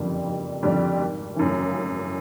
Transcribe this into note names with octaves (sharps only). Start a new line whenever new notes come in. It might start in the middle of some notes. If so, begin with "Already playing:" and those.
Already playing: F#1 F2 D3 G3
F#1
F2 D3 G3
G#1
F#2 C#3 E3 A3
G#1